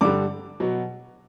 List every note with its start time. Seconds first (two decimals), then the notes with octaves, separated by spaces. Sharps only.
0.01 G2 D3 G3 D6
0.60 B2 F#3